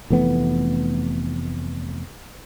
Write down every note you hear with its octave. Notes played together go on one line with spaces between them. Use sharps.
F1 E3 A3 B3